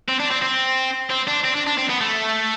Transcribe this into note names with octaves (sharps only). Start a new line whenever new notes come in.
C4
D4
C4
C4
C4
D4
C4
D4
D4
C4
B3
A3